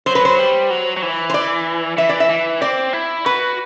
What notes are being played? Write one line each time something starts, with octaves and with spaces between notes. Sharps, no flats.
F#3 C5
B4
C5
G3
F#3
F#3
E3
C5
D5
E3 E5
D5
E5
E3
C4 D5
E4
F#4 B4